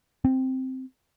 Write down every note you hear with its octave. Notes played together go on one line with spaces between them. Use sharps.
C4